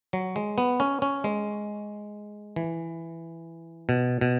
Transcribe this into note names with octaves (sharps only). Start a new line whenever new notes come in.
F#3
G#3
B3
C#4
C#4
G#3
E3
B2
B2